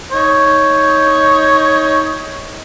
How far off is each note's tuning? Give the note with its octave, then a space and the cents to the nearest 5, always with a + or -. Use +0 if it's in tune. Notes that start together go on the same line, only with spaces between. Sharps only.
D#4 +20 C#5 +0